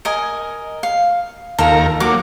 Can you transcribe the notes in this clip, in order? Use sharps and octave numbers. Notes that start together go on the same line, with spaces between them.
A#4 D#5 G#5
F5
D#2 F4 A4 A#4 A#5
F#3 A#3 D6